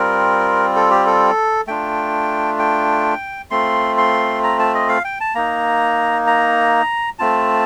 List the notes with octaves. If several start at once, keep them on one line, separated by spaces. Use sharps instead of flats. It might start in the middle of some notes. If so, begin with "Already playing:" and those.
Already playing: G3 C4 F4 A#4
A4
G4
A4
A3 D4 F4 G5
G5
A3 C4 F4 C6
C6
A#5
A5
D#5
F5
G5
A5
A#3 D#4 A#5
A#5
A3 C4 F4 A5